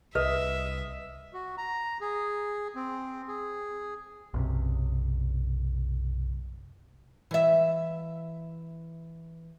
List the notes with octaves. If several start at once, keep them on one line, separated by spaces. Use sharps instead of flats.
C2 B4 D#5 E5
F#4
A#5
G#4
C4
G#4
B1 F#2 C3
E3 E5